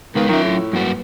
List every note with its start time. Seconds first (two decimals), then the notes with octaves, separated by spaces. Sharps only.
0.15 C#2 D#3 G#3 B3 B4 F5
0.29 D#3 F#3 C#4 F4 E5
0.44 A2
0.73 G2 F#3 A#3 F#4 B4